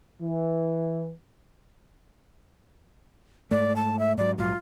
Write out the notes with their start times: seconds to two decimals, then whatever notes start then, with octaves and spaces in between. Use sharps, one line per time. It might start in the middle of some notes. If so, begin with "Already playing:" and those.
0.21 E3
3.51 G#2 A3 D5
3.76 A5
3.99 E5
4.18 G#2 F#3 D5
4.38 A#1 G#2 F#3 F4